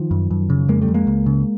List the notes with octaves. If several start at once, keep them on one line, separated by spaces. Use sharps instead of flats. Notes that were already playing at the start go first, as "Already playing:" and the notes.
Already playing: D#3 F3
F#2
F#2
C#3
F2 G#3 A#3
G3 A3
F2
G#3 A#3
C#2
C#3